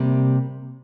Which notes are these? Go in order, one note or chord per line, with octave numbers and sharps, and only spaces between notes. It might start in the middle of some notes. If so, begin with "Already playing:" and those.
Already playing: C3 G3 A#3